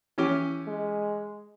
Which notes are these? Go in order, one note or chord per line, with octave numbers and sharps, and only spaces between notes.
E3 C#4 G4
G#3